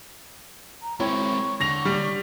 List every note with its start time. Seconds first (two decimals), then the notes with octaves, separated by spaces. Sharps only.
0.82 A#5
1.00 G#3 C4 E4 C#5 G5 C#6
1.61 D3 A#6 F7
1.85 G3